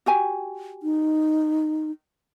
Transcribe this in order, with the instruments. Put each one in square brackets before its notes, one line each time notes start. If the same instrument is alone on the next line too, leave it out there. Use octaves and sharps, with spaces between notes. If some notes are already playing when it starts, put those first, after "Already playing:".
[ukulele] F#4 G4 G#5
[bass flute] D#4